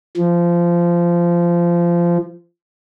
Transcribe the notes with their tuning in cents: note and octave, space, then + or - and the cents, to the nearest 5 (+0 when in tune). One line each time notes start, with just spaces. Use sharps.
F3 -20